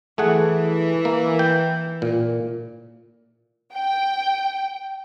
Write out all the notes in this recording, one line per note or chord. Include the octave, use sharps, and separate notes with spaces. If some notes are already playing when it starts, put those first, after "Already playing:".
E3 A3 G#4 F#5
A#3
G5
A#2
G5